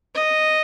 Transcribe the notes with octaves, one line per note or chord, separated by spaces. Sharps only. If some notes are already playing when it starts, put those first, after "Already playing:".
D#5